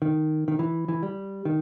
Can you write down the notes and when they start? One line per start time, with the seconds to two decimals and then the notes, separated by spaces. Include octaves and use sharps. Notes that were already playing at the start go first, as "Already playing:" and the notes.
0.02 D#3
0.48 D#3
0.59 E3
0.88 E3
1.03 G3
1.45 D#3